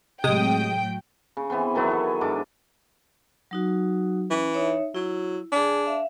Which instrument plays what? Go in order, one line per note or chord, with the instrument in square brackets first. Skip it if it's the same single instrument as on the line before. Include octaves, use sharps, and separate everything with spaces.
[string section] A2 F#3 G5 [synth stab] C3 G#3 D#6
[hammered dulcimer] C#3
E3 B3 C4 C6
D#3 F#3 B3 E4
A4
G#2 D4 D6
[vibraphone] F#3 D#4 F#4
[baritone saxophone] E3 [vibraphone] C#4
[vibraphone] D#4 C#5 E5
[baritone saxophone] F#3 [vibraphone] E4
[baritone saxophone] D4 [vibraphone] G#4 G#5
[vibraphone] E5 F5